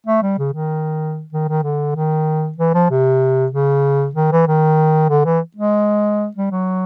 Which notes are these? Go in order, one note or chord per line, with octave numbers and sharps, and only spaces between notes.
A3
G3
C#3
D#3
D#3
D#3
D3
D#3
E3
F3
C3
C#3
D#3
E3
D#3
D3
E3
G#3
G3
F#3